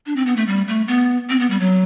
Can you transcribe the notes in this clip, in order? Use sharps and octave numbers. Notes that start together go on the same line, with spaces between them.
D4
C4
B3
A3
G3
A3
B3
C4
B3
G3
F#3